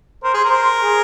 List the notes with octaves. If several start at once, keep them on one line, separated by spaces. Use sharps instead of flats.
A#4 C5
G#4 C5
A#4
C5
G#4